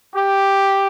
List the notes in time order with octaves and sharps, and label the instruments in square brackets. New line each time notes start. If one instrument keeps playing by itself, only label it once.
[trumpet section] G4